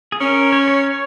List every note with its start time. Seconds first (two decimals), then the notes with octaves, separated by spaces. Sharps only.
0.12 G#4
0.20 C#4 A#4
0.53 C#5
0.68 C#5
0.84 C#5